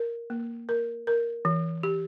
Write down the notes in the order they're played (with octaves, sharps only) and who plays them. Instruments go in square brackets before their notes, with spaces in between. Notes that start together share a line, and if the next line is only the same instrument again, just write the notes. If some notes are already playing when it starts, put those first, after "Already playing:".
Already playing: [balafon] A#4
A#3
A#4
A#4
E3
G4